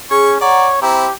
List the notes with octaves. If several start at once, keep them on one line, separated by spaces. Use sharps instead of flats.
C#4 G#4 C#6
C#5 D5 F#5 A#5
C4 E4 G4 A#5